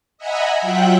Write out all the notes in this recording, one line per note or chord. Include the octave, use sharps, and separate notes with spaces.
D#5 E5 F#5 G#5 A#5 B5
F#3 F4 E5 F#5 G5 F#6